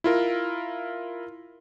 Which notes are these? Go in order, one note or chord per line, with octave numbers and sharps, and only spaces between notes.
E4 F4 A#4